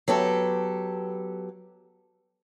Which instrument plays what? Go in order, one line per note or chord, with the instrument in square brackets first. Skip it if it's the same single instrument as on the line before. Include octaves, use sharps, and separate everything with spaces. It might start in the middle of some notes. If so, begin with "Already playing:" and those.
[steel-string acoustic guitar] F#3 B3 G4 A4